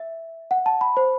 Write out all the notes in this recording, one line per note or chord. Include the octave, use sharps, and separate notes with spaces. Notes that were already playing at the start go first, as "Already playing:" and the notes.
Already playing: E5
F#5
A5
B5
C5